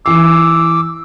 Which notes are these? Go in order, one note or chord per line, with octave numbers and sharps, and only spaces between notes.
E3 D6 E6 C7